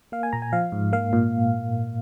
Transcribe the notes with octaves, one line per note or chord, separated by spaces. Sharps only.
A#3 F5
G#5
A#2 A#5
G#5
F3 F5
G#2
A#3 F5
A#2